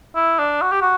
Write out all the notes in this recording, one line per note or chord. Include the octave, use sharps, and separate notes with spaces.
E4
D4
F#4
G4
F#4